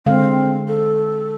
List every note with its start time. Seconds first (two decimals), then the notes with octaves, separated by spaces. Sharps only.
0.06 D3 G#3 C4 F5
0.68 A4